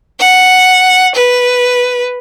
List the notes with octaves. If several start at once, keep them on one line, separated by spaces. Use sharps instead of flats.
F#5
B4